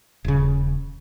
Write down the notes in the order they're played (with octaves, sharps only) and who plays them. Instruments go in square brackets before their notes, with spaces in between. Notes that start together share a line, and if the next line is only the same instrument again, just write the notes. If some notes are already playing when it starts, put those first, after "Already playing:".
[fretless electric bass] D#1 C#3